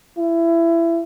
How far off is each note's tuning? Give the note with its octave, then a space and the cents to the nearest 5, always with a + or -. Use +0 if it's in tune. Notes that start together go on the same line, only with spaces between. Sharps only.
E4 +20